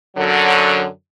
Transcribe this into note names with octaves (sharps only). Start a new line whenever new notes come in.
F#2 D3 F#3